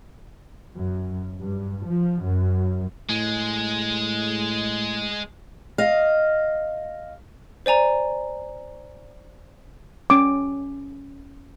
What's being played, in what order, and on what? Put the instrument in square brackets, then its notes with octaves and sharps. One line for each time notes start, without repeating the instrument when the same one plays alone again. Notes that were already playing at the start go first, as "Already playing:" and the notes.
[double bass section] F#2
G2
F3
F#2
[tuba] A2 [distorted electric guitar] G#3
[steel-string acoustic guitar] D#5 F5
[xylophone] C5 D5 G#5 A#5
[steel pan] C#4 D6